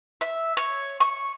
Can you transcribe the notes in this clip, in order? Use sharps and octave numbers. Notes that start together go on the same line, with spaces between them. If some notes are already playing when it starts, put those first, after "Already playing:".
E5
C#5
C#6